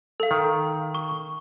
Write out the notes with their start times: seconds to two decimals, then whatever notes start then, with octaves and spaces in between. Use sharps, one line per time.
0.20 A4 F5
0.31 D#3
0.95 C#6